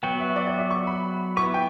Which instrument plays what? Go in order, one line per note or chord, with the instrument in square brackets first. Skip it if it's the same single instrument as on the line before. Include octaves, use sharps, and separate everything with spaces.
[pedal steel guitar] F#3 B3 F#4 [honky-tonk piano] G5
[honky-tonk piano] E5
D5
D5
E5
C#6
B5
[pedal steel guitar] B3 E4 B4 [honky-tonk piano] C#6
[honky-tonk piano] G5